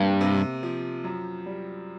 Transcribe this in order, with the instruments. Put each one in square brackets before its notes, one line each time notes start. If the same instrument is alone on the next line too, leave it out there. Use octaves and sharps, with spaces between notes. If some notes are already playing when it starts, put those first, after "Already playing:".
Already playing: [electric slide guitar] G2 [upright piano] C3 A#3
[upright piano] C3
F3
F#2
G3